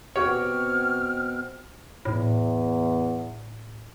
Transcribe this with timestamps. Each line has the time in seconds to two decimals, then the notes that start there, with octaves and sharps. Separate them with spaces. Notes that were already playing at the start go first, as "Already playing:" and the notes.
0.16 B2 C4 F#4 G4 C#5 F6
2.05 E2 A2